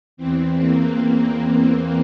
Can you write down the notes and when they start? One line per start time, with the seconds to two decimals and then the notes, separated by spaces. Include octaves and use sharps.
0.17 E2 E3 C4
0.57 A#3
0.97 A#3
1.38 A#3